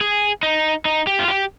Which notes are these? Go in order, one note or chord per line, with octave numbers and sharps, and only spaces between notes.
G#4
D#4
D#4
G4
F4
G4